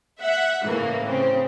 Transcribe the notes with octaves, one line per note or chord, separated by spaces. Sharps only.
E5 F#5
A2 C#3 E3 A#3
C#3 C4